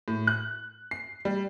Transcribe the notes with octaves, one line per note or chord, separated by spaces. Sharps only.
A2
F#6
C7
G3